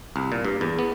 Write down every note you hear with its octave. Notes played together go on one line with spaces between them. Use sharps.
C2
A#2
G2
E2
B3